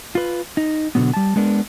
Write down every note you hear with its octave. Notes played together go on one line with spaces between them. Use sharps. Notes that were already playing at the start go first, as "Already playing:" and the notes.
F4 B4
D#4
B2 D3 D#3 F#3 B3
G3 A5
G#3 B3 D4 A#4